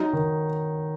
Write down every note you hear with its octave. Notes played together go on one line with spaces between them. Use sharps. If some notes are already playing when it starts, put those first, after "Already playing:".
Already playing: F#3 D#4
D#3